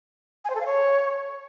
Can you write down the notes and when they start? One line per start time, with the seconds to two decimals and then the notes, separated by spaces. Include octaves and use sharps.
0.45 G#5
0.50 C5
0.55 A4
0.61 F5
0.66 C#5